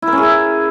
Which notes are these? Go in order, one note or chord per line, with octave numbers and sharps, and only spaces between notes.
E4
A#4
C#4
G#4
E4